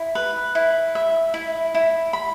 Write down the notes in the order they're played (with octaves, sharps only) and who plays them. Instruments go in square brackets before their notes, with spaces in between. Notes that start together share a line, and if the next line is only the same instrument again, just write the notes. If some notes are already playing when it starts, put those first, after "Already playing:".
Already playing: [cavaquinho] E4
B4
E4
E5
E4
E4
B5